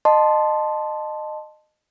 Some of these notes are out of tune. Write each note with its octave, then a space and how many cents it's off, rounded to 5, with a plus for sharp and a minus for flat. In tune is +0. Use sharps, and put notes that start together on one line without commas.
D#5 -20 A5 -5 C6 +0